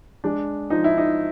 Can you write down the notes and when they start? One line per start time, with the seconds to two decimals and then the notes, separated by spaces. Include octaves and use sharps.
0.24 G#3 D4
0.70 F3 D#4
0.84 E4
0.98 D#4